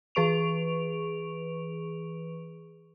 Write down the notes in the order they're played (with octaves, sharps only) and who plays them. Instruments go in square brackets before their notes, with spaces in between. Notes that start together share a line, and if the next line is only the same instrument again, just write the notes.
[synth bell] E3 G#4 B4 C#6 D7 F7